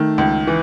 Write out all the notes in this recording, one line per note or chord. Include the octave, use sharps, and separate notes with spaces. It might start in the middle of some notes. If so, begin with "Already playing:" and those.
Already playing: D#3 A3
C#2
E3